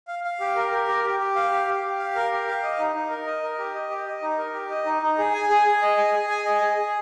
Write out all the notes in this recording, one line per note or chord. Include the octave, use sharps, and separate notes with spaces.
F5
F5
G4
A#4
A#4
G4
G4
G4
F5
G4
G4
G4
F5
A#4
G4
F5
D#5
D#4
D#4
A#4
D#5
A#4
G4
D#5
G4
D#5
D#4
A#4
G4
D#5
D#4
D#4
G#4
G#5
G#4
G#4
D#5
G#5
G#4
G#5
D#5
G#4
G#4